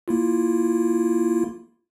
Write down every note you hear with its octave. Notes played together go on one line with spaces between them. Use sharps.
A#3 E4 F4